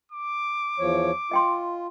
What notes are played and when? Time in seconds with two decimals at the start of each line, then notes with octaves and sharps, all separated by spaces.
0.11 D6
0.79 E2 F3 C#5
1.31 F4 D#5 G5 C6